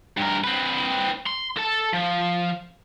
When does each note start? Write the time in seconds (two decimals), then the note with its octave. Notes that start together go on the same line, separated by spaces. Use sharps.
0.18 G2 A#4
0.44 C4 B4
1.27 C6
1.57 A4 A5
1.94 F3